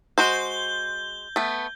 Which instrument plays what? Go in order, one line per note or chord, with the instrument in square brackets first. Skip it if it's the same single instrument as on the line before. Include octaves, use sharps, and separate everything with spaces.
[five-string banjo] G#3 F#4 C5 [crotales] G6 G7
[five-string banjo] A3 B3